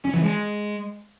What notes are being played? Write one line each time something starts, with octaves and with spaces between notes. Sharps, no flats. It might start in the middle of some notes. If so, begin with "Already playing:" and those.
C#4
E3
G#3